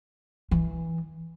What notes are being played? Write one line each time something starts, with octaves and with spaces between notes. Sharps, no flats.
E3